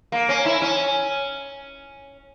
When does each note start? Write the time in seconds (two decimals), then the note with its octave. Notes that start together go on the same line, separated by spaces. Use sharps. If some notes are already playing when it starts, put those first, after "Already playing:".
0.12 A#3
0.29 C#4
0.46 E4
0.62 C#4